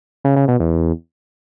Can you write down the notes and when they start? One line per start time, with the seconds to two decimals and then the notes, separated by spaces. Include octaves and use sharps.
0.24 C#3
0.36 C#3
0.48 B2
0.60 E2